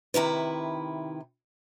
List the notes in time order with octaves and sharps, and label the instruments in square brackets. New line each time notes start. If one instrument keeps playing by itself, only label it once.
[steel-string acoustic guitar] C3 D#3 E4 B4